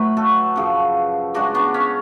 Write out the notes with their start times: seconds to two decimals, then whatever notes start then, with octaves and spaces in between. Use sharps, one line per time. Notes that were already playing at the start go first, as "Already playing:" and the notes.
Already playing: A2 F#3 A3 B4
0.17 F#4 A4
0.56 F#2 C#3 F3
1.34 C#3 G#3 D4 F#4
1.55 B3 D4
1.74 C#4